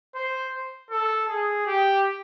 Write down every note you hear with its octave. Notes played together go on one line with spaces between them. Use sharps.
C5
A4
G#4
G4